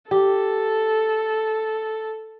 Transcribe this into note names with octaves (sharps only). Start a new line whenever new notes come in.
G4 A4